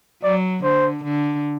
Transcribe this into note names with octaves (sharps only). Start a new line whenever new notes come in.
F#3 D5
D3 C5
D3